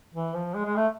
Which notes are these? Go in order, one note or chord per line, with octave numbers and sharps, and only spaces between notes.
E3
F3
G#3
G#3
A3